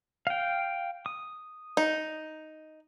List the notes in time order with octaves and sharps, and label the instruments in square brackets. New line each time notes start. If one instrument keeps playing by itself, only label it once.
[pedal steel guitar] F5 G5
D#6
[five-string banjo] D#4